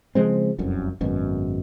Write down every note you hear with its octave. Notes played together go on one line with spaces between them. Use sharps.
C#3 F3 G#3 C4
F1 C2 F#2
G#1 F#2 B2